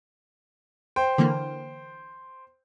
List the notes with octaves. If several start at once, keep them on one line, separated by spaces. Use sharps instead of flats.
C5 G5
D3 E3 A#3